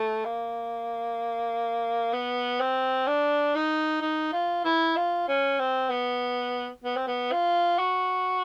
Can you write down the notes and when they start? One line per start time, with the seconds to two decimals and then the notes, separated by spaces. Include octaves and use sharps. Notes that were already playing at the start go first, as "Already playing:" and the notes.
Already playing: A3
0.25 A#3
2.13 B3
2.60 C4
3.08 D4
3.55 D#4
4.02 D#4
4.33 F4
4.65 E4
4.96 F4
5.28 C#4
5.59 C4
5.90 B3
6.84 B3
6.96 C4
7.08 B3
7.32 F4
7.79 F#4